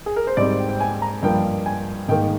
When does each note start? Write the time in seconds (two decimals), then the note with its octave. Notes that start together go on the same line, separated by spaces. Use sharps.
0.06 G#4
0.16 A#4
0.27 C5
0.37 G#2 G3 C4 D5
0.59 G5
0.69 G5
0.81 G#5
1.02 A#5
1.23 G2 F3 A#3 G5
1.66 G#5
2.09 G#2 G5
2.12 D#3 A#3